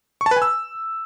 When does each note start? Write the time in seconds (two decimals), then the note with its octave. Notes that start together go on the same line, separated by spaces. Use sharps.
0.21 C#6
0.26 A5
0.31 B4
0.36 G#5
0.42 E6